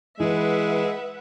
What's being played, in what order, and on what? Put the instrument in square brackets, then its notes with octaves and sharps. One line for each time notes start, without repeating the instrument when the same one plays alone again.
[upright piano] E3 [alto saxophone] G#3 [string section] B4 E5 F#5